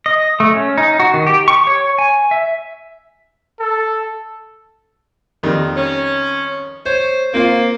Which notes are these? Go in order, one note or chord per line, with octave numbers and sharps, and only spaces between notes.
D#5
A3
C#4
D#4
F#4
D#3
G4
C#6
C#5
G#5
E5
A4
F2 D#3 G3
C#4
C5 C#5
A#3 C4 F4 C5